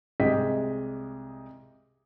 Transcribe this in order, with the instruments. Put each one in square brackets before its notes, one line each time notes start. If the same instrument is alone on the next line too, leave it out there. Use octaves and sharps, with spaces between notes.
[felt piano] C2 G#3 G4 G#4 D#5 B6